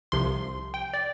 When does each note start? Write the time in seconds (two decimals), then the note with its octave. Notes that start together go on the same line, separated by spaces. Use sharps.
0.12 C2 C3 F3 C6
0.74 G5
0.94 D5